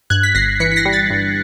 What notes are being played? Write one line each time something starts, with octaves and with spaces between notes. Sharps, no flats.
G2 F#6 G#6
B6
G1 A#6 C7
E3 B6 C#7
B6
A#6 C7
G3
A6 B6
G2